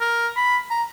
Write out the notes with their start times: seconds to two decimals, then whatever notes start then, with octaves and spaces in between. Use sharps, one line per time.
0.01 A#4
0.36 B5
0.71 A#5